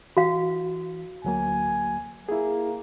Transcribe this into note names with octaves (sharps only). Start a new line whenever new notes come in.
E3 F#4 F5
D2 F#3 A#3 G#5
A#3 E4 G#4